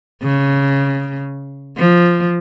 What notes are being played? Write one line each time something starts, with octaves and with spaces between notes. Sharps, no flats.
C#3
F3